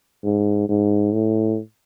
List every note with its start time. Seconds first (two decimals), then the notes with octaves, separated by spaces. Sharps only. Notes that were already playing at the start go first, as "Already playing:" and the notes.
0.24 G#2
0.69 G#2
1.13 A2